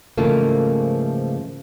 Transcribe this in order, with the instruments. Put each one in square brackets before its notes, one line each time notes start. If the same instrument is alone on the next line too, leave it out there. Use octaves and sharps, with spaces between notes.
[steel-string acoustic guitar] G#2 C#3 E3 F3 A3 A#3